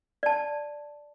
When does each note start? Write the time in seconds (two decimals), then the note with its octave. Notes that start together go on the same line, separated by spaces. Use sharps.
0.23 D5 A5